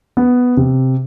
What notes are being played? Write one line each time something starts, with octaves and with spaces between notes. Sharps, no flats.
B3
C3